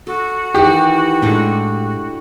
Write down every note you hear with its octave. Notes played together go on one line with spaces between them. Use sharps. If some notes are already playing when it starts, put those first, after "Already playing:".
F#4 A4
D#3 E3 G4
A2 G#3 A3 D4 E4